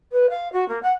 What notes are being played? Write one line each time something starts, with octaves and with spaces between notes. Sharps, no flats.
B4
F5
F#4
A#3
F#5